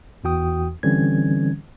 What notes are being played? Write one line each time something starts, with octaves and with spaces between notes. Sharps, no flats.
E2 E3 F#4 G5 D#6
D3 E3 G3 C4 C#4 G#6